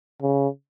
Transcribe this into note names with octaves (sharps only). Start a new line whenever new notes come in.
C#3